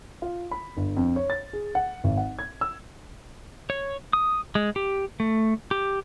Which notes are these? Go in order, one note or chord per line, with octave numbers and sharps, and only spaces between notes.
F4
B5
G1
F2
C#5
A6
G#4
F#5
G#1
F#5
G#6
E6
C#5
D#6
G#3
G4
A3
G4